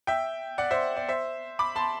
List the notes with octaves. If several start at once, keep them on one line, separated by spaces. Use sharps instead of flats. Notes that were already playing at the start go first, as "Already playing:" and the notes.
E5 G5
D5 F#5
C5 E5
D5
C5 E5
B5 D6
A5 C6